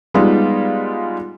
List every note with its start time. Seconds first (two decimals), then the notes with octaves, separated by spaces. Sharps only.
0.14 G3 G#3 B3 D#4 F4